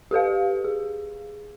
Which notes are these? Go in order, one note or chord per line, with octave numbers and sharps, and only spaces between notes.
G4 A4 B4 F5
G#4